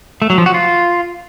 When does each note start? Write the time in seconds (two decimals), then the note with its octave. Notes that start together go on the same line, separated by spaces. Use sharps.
0.22 A3
0.30 F#3
0.38 F3
0.46 F#4
0.54 F4